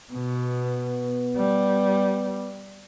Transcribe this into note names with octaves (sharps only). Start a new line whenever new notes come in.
B2 B3
G3